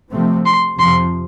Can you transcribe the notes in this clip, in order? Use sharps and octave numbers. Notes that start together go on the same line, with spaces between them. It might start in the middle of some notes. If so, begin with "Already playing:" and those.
C3 F3 A3 C4
C6
F2 C3 F3 C6